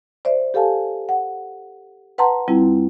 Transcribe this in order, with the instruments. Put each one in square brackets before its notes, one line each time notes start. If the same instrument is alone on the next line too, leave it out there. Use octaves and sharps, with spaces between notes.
[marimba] C5 D5 E5
G4 A4 F5 G#5 A5
F#5
B4 F#5 A5 A#5 C6
F2 G3 C4 E4